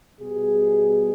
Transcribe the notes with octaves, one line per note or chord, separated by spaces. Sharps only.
B2 G3 G#4